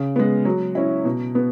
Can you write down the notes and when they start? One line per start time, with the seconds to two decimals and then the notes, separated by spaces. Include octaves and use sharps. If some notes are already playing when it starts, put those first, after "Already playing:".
Already playing: C#3
0.16 G#3 B3
0.45 F#3
0.75 C#4 E4
1.05 B2
1.35 B3